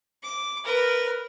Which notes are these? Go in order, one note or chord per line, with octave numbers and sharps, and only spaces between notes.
D6
A#4 B4